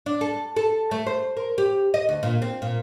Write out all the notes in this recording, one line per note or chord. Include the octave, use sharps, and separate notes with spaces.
D4
A4
A4
A3
C5
A#4
G4
D#5
D2
A#2
C4
A#2